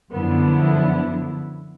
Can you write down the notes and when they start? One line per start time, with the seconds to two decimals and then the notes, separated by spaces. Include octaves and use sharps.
0.11 F#2 D3 F3 B3 E4